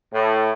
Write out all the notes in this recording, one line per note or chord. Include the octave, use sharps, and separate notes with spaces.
A2